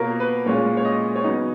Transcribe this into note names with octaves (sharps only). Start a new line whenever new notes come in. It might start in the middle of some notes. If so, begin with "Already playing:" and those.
Already playing: B2 A#3 F4 A#4 C#5
B4
A#2 G#3 C#4 F4 C#5
C#5
D#5
C#5
C#3 F#3 B3 D#4 D#5